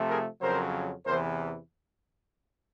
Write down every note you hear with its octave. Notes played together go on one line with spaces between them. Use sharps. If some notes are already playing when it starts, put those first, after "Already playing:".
Already playing: C3 F3 A3
G#4 A#4
F2 C#3 F#3 A#4 C5
E2 C3 E3 A#4 C5